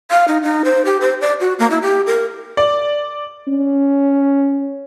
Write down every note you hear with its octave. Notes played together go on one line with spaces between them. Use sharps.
F5
D#4
D#4
C5
G4
C5
D5
F#4
A#3
E4
G4
A#4
D5
C#4